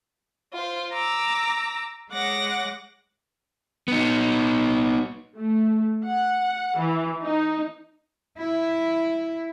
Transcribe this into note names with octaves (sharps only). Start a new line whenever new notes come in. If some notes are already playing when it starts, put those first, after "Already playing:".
F4 C5
A#5 D6 E6
G#3 C#5 F#5 D6 A#6
B3 D#4
A3
F#5
E3
D#4
E4